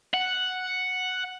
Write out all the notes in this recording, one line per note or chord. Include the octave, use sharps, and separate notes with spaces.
F#5